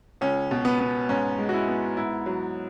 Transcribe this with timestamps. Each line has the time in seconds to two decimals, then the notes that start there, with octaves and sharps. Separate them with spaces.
0.21 C#2 C#4
0.51 B2
0.65 B3
0.80 B3
1.09 G#2 C#4
1.38 G#3
1.49 F#4
1.53 E4
1.68 B3
1.97 G#2 E4
2.26 F#3